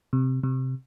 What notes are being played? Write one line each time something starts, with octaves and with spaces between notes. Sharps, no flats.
C3
C3